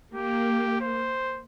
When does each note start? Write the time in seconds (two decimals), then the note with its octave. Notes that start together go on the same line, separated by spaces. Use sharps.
0.14 A#3 G4
0.81 C5